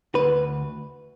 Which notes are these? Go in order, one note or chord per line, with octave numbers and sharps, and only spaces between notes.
D2 B4